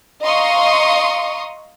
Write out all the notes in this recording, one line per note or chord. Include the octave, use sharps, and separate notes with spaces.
D#5 F5 A#5 C6 C#6 D#6